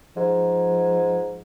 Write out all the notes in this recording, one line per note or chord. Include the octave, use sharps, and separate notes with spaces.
G#2 F3